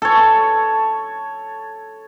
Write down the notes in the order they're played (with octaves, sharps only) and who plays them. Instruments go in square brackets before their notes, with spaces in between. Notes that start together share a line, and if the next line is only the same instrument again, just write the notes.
[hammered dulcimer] A4 C#5